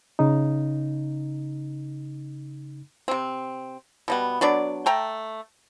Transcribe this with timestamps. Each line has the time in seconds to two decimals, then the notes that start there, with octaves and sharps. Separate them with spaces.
0.19 C#3 D#4
3.08 C3 C4
4.08 B2 G3 B3
4.41 F#3 B3 D4 D5
4.86 A3 G5 A#5